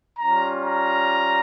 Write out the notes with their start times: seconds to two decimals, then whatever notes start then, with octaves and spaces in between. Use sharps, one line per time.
0.19 G3 C#4 F4 A#5
0.65 A#5